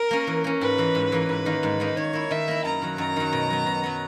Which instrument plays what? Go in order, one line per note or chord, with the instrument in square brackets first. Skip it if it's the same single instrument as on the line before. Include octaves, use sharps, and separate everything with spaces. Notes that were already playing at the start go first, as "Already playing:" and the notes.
Already playing: [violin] A#4
[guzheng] A#3 C#4
E3
A#3 C#4
[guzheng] G#2 [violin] B4
[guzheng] E3 A#3
G#2
E3 A#3
[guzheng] G#2 [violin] B4
[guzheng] D#3 A#3 D#4
G#2
D#3 A#3 D#4
[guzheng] D#3 [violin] C#5
[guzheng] A#3 E4
[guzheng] D#3 [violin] E5
[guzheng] A#3 E4
[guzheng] F#2 [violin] A#5
[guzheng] D#3 F#3
[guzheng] F#2 [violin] A#5
[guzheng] D#3 F#3
B2
F#3 B3
B2
F#3 B3